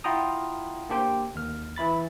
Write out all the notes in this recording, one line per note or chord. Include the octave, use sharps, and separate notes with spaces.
E4 F4 F#5 G5 A#5 D#6
A#3 D4 G4 C5 G5
D#2 F6
E3 E4 B5 A6